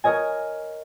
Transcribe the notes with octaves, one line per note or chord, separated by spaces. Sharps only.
A#4 C#5 D#5 G#5